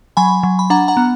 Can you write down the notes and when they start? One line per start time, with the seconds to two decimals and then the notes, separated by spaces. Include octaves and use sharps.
0.17 F#3 G#5 B5
0.43 F#3
0.59 B5
0.70 D4 F#5 A#5
0.88 F#5 A#5
0.97 B3